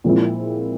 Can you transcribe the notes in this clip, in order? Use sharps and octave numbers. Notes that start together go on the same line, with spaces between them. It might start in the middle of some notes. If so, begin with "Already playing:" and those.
A#2 F3 G#3 C4 E4